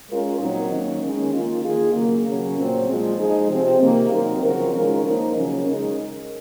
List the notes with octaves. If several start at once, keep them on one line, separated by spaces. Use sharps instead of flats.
G#3 C#4 F4 A#4
A#2 F#3 C4 D#4
D#3 A#3 C#4
D#3 G#3 C#4
D#3 A#3 F4
D#3 A#3 F4 G#4
C#3 F#3 A#3
C#3 F#3 C#4
A#2 F#3 C4
A#2 F3 G#3
F3 G#3 D#4 G#4
C3 F3 C4
C3 D#3 A#3
F#3 C4 D#4 A#4
C#3 F3 C4 F#4 A#4
D#3 G#3 C#4 F4 A#4
F3 A#3 D#4 A#4
C#3 F#3 C#4
C#3 G#3 D#4 A#4